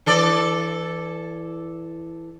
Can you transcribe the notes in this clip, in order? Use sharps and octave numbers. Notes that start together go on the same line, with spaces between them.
E3 A4 D5